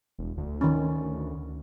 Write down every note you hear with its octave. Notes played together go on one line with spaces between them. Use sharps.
E1
D2
D#3 C#4